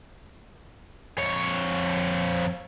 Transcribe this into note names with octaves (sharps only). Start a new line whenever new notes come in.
F2 C#5